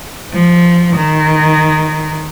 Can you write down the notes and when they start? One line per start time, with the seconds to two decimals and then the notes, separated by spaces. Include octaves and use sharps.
0.33 F3
0.96 D#3